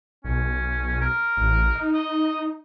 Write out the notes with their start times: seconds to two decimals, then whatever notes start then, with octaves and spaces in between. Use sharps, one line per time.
0.24 B1 C#4
1.01 A#4
1.37 A1
1.75 D#4
1.94 D#5